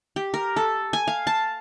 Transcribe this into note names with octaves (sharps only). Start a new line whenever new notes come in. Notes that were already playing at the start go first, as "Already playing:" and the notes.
G4
A#4
A4
G#5
F5
A5